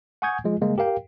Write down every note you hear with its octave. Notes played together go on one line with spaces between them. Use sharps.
F#5 G#5 C#6 D#6 G6 G#6
F3 G#3 F4
C#3 G3 G#3 A#3
G4 A#4 F5 G5